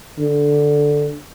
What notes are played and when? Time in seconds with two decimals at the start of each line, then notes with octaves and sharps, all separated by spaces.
0.19 D3